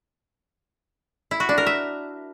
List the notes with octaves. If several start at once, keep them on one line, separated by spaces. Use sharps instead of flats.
E4
F#4
D4
A#4
E5